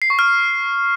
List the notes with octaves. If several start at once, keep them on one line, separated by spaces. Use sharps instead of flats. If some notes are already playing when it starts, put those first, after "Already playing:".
C7
C#6
F6